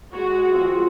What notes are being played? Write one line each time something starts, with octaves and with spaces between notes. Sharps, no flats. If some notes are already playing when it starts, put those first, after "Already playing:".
G#3 F#4 C#5
F3 C4 F4